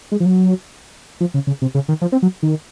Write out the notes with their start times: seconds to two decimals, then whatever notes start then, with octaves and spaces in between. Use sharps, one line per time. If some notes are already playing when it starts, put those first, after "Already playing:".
0.12 G#3
0.20 F3
0.26 F#3
1.21 F3
1.34 C#3
1.47 C#3
1.62 C3
1.75 C#3
1.88 D#3
2.02 F3
2.12 C4
2.22 F#3
2.43 D#3